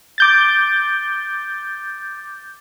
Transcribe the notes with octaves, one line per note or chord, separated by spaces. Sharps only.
D6 G6 A6